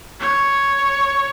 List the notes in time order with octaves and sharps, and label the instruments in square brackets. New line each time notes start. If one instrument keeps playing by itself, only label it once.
[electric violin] C#5